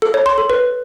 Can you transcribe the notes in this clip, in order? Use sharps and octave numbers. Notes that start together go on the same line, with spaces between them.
A4
C#5
C6
A4
B4